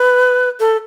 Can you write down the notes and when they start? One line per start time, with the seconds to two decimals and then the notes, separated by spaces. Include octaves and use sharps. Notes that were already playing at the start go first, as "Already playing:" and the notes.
Already playing: B4
0.60 A4